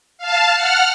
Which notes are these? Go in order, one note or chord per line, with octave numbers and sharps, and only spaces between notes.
F5 A5
F#5 F6